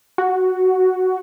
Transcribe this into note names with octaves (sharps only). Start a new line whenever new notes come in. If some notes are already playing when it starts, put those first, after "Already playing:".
F#4